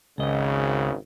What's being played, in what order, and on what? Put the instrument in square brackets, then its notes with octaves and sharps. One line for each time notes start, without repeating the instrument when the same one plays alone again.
[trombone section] G#1 C#3 [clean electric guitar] C#2 D#5